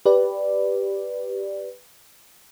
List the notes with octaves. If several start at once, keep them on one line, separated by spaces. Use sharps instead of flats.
G4 B4 D5